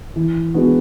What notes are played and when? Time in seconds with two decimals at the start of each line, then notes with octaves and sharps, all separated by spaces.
0.16 E3
0.54 G#3 B3 D4 F#4